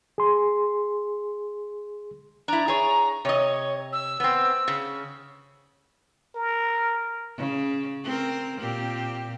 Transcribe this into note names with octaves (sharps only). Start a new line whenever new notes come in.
G#4 C6
D4 E4 A#5
G#4 C#5
C3 C#5 D#5
E6
B3 C4
C#3
A#4
C#3
C4 A#4
A#2 C4 G4